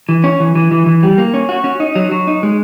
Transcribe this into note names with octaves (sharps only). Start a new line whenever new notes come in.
E3
C#4
E3
E3
E3
E3
G3
A#3
C#4
F#4
C#4
D#4
F#3
F#3
D#4
G#3